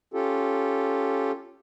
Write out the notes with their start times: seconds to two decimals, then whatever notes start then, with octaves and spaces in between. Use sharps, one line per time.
0.14 C#4 F4 G4 A4